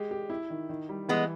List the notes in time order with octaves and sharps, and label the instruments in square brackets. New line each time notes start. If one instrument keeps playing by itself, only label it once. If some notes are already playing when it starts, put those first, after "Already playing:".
Already playing: [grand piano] G#3 G4
G4
E4
D#3
D#3
G3
[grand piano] E3 [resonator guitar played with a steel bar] G#3 B3